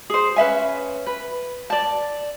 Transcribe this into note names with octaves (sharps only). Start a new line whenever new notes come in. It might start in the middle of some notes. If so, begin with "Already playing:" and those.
G#4 C5
C#4 B4 E5 G#5
B4
D5 A5